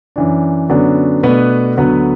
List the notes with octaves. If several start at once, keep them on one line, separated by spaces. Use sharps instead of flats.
F#2 E3 D4
F#2 D3 F#3 B3 D4
B2 A3 B3 D4 B4
D2 D3 F#3 B3 B4